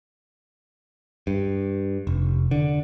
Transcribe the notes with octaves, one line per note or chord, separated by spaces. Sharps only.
G2
F1
D3